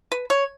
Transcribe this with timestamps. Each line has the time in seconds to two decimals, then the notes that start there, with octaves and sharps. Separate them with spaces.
0.12 B4
0.30 C#5